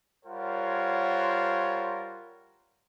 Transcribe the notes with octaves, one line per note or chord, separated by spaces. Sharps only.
G3 F4 A#4 C5 C#5 F#5